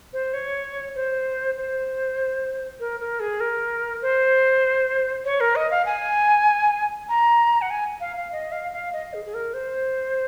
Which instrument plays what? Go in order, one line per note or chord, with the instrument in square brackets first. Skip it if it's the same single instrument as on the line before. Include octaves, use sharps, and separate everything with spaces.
[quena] C5
C#5
C5
C5
A#4
A#4
G#4
A#4
C5
C#5
A#4
D#5
F5
G#5
A#5
F#5
G#5
F5
F5
D#5
F5
F5
D#5
G#4
G#4
A#4
C5